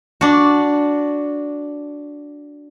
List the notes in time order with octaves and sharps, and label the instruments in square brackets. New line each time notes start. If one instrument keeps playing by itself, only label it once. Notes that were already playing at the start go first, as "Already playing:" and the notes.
[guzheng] D4 F#4